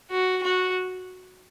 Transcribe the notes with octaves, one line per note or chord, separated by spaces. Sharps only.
F#4
F#4